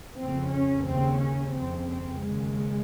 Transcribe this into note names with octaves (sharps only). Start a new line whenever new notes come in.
F2 C#3 C4
C#4
D#2 C#3 C4
C#4
F2 C#3 C4
C4
D#2 C#3 G#3